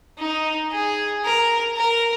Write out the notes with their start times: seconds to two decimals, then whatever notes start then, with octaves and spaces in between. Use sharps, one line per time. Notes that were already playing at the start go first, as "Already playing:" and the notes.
0.19 D#4
0.72 G#4
1.24 A#4
1.77 A#4